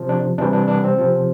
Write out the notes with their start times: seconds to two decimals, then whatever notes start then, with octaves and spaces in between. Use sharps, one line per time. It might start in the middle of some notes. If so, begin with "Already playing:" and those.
Already playing: C3 F3
0.09 D4
0.38 C3 E3 G3 D4
0.53 D4
0.68 D4
0.84 C4
0.98 C3 F3